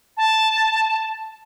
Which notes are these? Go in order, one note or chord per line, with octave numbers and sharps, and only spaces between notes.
A5